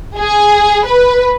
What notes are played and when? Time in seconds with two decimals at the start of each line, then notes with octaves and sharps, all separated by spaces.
0.18 G#4
0.86 B4